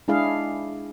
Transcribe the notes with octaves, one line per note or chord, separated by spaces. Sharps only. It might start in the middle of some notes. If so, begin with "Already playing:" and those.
G#3 D4 E4 G#4 F5